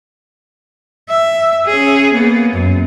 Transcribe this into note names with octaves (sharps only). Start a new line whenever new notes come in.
E5
C#4 G#4
A#3 B3
F#2